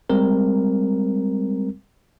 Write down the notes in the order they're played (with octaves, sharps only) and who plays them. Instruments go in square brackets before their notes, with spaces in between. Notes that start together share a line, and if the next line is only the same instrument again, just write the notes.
[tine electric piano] G3 G#3 C4 A#4